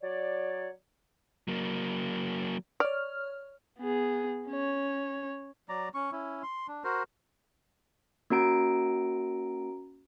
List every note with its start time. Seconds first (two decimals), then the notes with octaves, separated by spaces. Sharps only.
0.02 F#3 C#5 D5
1.48 F#3 A#3
2.80 C#5 D5 F6
3.79 B3 G#4
4.48 C#4 C#5
5.69 F#3 D5 A#5
5.94 C#4 C#6
6.12 C#4 E4
6.43 C6
6.68 D4
6.84 F#4 A#4 C5
8.30 A#3 C#4 F#4 A#5 D7